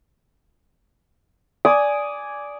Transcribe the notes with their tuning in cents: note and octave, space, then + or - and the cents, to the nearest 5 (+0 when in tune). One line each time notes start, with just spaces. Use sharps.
D5 -10 G#5 +0 D#6 +0